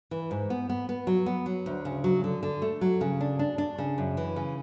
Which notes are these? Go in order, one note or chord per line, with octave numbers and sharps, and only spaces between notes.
E3
G#2
B3
B3
B3
F#3
B3
F#3
D2
C#3
F#3
D3
D3
A3
F#3
C#3
D4
D4
D4
C#3
F#2
E3
C#3